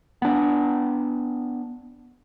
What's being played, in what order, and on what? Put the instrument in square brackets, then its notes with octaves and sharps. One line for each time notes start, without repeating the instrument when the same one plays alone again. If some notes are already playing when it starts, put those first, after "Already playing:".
[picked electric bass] B3 D4